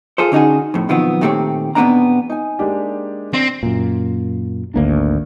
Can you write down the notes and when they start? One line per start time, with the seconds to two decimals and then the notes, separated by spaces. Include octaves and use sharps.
0.18 F4 G#4 A4 C5
0.32 D3 C#4 D#4 F#4 G#4
0.74 F2 A2
0.89 B2 D#3 F3 F#3 B3 C4
1.21 A#2 D#3 A3 C4 G4 C#5
1.75 E2 B2 B3 C4 D4 A#5
2.30 D#4 G#5
2.59 G#3 A#3 D4 G4
3.34 C4 D4 A#6
3.63 F#2 A#2
4.74 G#1 D2 A#3 D4